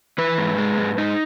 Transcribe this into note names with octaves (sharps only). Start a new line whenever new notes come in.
E3 B4
G#2
G#3
G#2
G#2 D#4